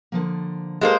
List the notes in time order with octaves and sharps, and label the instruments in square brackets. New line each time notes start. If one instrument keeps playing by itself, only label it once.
[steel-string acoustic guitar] D3 F3 A#3
[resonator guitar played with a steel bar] G#3 A#3 C5 [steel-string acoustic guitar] G4 A4 G#5